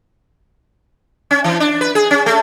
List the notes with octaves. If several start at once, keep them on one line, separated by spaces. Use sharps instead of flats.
C#4
E3
D4
B4
G#4
C#4
A3